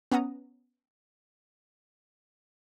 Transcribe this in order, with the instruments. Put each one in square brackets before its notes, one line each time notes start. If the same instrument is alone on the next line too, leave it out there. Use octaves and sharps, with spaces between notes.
[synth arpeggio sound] B3 C#4 F#5 A#5 D#6